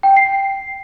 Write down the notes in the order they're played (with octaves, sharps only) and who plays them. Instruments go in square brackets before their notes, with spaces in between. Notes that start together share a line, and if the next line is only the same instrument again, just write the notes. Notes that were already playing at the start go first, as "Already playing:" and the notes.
[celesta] G5
C7